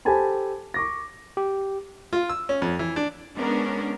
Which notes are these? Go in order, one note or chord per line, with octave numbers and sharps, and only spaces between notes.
G4 A4 C5 G#5 A5 B5
C#6 D6 A#6
G4
F4
E6
C#4
F2
E3
D4
G#3 B3 C#4 D4 A#4